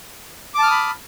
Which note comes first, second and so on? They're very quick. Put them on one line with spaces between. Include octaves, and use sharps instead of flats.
D6 A5 F6 D#6 B5